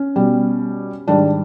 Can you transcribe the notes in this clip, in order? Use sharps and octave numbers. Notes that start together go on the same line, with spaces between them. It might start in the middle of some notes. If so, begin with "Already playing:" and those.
Already playing: C#4
B2 G3
G#2 D#3 G3 D4